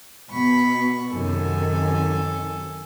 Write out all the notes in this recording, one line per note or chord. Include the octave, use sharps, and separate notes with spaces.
B2 B5 C#6
F#2 C3 D#3 A4 G#5